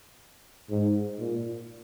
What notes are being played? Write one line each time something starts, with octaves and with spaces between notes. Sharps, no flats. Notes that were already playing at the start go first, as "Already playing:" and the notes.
G#2
A#2